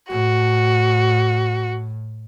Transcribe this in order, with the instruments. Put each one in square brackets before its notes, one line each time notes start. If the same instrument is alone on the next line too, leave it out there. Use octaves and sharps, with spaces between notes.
[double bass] A2 [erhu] F#4